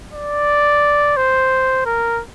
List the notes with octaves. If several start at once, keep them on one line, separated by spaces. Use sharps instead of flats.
D5
C5
A#4